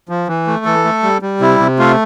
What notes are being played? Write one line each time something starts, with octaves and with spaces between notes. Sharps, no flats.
F3
E3
A3
E3 A4
A3
G3
G3
C3 E4
C3
A3 F4